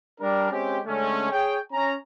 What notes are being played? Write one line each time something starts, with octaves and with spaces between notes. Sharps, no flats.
G3 D4 A#4
G#3 C4 C#4 G4
D3 G#3 A3 C#4
G#4 C#5 G5
C#4 A#5